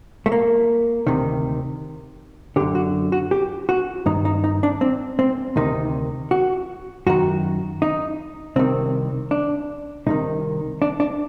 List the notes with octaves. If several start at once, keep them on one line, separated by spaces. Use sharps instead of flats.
A3
A#3
D2 C3 D#3
F#2 D3 G4
F#4
F#4
G4
F#4
G2 D#3 D#4
D#4
D#4
D4
C4
C4
D2 C3 D#3 D#4
F#4
F#2 D#3 F#4
D#4
C2 C3 D#3 C4
D4
C2 C3 D#3 D#4
D4
D4